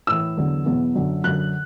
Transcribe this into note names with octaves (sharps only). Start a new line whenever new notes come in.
A2 E3 E6
E2 D3 F#3
E2 B2 F#3
F#2 D3 F#3
F#2 D3 F#3 F#6